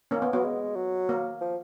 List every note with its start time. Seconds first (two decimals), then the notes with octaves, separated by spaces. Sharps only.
0.11 D#3 A#3 C#4
0.22 B3
0.33 F#3 B3
0.44 G#3
0.76 F#3
1.09 A#3
1.41 F3